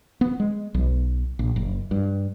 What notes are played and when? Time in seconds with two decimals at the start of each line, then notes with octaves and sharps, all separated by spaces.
0.21 B3
0.40 G#3
0.74 B1
1.39 A#1
1.56 F#1
1.91 G2